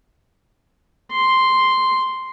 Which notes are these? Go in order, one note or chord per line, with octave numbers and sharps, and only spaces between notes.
C6